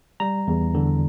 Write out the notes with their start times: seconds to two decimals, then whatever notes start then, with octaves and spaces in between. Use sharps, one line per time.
0.20 G3 A#5
0.47 E2
0.74 D3